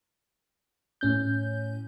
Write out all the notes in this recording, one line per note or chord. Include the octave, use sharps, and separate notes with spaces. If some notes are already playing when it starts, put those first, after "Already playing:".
A2 C#4 G6